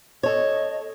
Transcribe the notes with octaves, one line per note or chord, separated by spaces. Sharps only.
A4 C#5 D#5